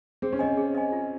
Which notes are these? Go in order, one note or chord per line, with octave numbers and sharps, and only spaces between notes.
C4 G#4
C#4
C4 D#5 G#5
G#4
D#5 G#5
F4